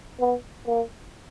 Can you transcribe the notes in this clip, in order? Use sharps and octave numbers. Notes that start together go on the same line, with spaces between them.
B3
A#3